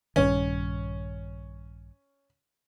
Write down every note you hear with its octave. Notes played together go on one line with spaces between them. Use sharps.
A#1 G2 D#3 C#4